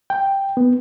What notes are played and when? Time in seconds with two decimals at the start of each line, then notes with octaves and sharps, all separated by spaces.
0.10 G5
0.57 B3